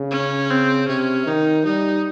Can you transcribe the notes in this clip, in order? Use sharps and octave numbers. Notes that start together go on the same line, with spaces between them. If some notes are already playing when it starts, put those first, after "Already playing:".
Already playing: C#3
C#4
C4
C3 C#4
D#3 D#4
G3 D#4